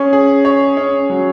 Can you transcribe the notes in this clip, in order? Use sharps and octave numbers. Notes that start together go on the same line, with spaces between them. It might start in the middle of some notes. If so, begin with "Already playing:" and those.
Already playing: C#4 G#4
G#4
C#5
C#4
F#3